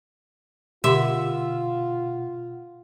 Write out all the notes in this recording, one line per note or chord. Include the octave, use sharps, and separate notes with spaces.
B2 D3 F4 G4 E5 F#5 C6